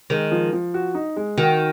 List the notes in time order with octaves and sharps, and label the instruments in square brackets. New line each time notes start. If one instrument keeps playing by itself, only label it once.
[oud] D#3 [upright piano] G#3
[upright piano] F3
F3
F#4
D#4
G#3
[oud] D#3 [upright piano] F#4